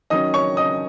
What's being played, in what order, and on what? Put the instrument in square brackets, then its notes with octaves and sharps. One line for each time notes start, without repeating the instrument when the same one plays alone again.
[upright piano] D#3 F#3 C#4 D#5 D#6
C#5 C#6
D#5 D#6